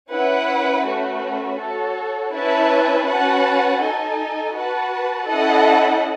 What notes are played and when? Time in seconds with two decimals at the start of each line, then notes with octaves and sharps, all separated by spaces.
0.12 C#4 E4 B4 F#5
0.86 A3 C#4 F#4 B4
1.59 F#4 A4 C#5
2.33 C#4 E4 B4 E5 A5
3.07 C#4 F#4 B4 F#5 A5
3.81 D#4 A4 D#5 G#5
4.55 F#4 B4 F#5 A5
5.28 C#4 E4 A4 D#5 F#5